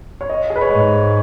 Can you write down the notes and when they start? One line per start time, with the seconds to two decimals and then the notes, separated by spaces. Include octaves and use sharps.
0.21 C#5
0.29 D#5
0.50 G#4
0.56 B4
0.61 C#5
0.70 G#2 D#5